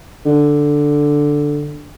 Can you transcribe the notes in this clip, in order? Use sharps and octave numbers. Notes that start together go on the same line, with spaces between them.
D3